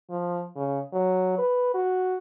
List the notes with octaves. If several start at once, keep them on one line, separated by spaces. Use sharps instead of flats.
F3
C#3
F#3
B4
F#4